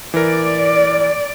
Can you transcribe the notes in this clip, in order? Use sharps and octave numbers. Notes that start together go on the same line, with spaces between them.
E3 A#4 D5